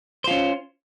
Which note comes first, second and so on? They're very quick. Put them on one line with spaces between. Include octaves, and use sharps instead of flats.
C5 F4 C#4